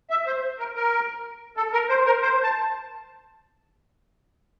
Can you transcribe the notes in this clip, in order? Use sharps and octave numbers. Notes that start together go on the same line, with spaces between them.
E5
C5
A#4
A#4
A4
A#4
C5
A#4
C5
A5